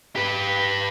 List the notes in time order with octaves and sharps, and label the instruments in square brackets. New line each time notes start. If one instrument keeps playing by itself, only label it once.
[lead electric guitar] G4 B4